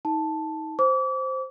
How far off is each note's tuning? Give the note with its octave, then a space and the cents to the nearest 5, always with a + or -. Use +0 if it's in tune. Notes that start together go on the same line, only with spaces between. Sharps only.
D#4 +30 A5 +0
C5 +0 D6 -35